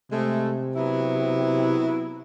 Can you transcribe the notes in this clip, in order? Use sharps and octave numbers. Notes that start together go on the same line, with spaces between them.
C3 G#3 A3
F#3 B3 E4